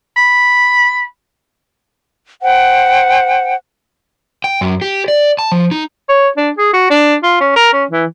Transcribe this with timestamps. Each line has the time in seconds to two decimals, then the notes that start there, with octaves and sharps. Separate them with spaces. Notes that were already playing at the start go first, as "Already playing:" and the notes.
0.16 B5
2.42 C5 F#5 G5
4.44 G5
4.61 F#2
4.82 G4
5.08 D5
5.39 A5
5.52 F3
5.71 D#4
6.09 C#5
6.37 D4
6.58 G#4
6.73 F#4
6.90 D4
7.23 F4
7.40 C#4
7.56 A#4
7.73 C#4
7.91 E3